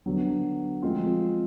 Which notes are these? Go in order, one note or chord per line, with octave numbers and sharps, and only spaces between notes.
D3 F#3 B3
F3 G#3 C4 F4